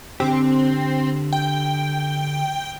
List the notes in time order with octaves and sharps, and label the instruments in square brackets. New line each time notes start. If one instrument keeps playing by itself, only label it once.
[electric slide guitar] D3 G4 [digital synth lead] C4
[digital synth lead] G5